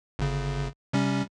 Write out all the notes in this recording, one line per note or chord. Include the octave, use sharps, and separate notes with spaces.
G1 C#3
C3 G3 C#4